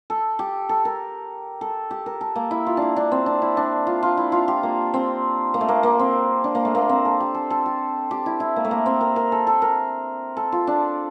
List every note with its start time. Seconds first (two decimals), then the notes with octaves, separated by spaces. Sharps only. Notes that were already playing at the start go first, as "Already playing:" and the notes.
0.10 A4
0.39 G4
0.69 A4
0.85 A#4
1.61 A4
1.91 G4
2.06 A#4
2.21 A4
2.35 A#3
2.51 E4
2.67 F4
2.77 D4 E4
2.96 D4
3.12 C4
3.26 D4
3.42 E4
3.57 D4
3.87 F4
4.03 F4
4.17 E4
4.32 F4
4.48 G4
4.63 A#3
4.94 C4
5.54 A#3
5.61 A3
5.68 A#3
5.83 A#3
5.99 C4
6.44 D4
6.55 A#3
6.65 A3
6.75 A#3
6.89 C4
7.05 A4
7.20 G4
7.34 A4
7.50 A4
7.66 G4
8.11 G4
8.26 E4
8.40 E4
8.56 A#3
8.65 A3
8.71 A#3
8.86 C4
9.01 A#4
9.16 A#4
9.32 A4
9.47 A4
9.62 A#4
10.37 A4
10.52 F4
10.67 D4